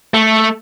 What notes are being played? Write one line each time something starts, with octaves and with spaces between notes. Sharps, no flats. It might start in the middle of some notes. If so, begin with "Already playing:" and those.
A3